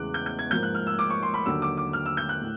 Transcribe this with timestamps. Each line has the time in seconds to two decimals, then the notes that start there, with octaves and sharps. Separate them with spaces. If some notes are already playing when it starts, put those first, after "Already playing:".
Already playing: E2 C#3 E3 G#3 D6 F#6
0.14 G6
0.26 G6
0.39 G#6
0.50 G#2 F3 A#3 G6
0.63 F#6
0.75 F6
0.87 E6
0.99 D6
1.10 C#6
1.23 C6
1.34 B5
1.46 D#2 D3 F#3 E6
1.62 D6
1.77 D6
1.93 F6
2.06 E6
2.17 G6
2.29 F#6
2.41 A2